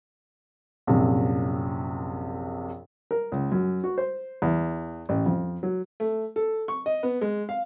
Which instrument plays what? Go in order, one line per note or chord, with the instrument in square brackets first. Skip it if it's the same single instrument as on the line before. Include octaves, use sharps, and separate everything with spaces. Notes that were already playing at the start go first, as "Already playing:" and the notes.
[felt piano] A#1 F#2 C3
[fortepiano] A#4
C#2
F#2
F#4
C5
E2
A1
F2
F#3
A3
A4
C#6
D#5
B3
G#3
F5